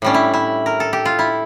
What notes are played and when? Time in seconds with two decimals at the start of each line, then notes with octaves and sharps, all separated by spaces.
0.02 A2 G3 C#4 D4
0.14 E4
0.34 E4
0.66 A#4
0.80 A4
0.93 G4
1.05 F4
1.19 E4